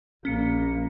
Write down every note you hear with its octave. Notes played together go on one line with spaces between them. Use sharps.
A#1 A#3 C#4 C#7